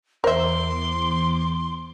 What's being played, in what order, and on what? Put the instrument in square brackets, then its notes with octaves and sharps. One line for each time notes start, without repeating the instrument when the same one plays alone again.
[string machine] E2 D6 [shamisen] A#4 E5 [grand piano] C5 [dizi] C6